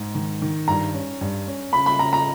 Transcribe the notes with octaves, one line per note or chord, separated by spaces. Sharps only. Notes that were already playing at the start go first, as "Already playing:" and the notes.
Already playing: G#2
D#3
D#3
G2 A#5
C#4
G2
C#4
C#3 B5
B5
C#3 A#5
A#5